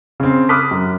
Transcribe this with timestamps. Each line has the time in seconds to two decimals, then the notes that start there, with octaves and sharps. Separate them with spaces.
0.20 C#3 C4
0.49 B5 D6 D#6 F6 F#6 B6
0.71 F#2